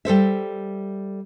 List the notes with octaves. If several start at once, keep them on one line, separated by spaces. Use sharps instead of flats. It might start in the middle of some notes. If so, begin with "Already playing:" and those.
G3 A4 C5 E5